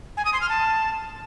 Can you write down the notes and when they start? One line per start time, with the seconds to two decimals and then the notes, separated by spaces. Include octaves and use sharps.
0.17 G#5
0.25 D#6
0.33 C6
0.41 F6
0.49 A5